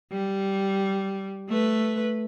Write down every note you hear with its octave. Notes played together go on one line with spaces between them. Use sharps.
G3
A3 B4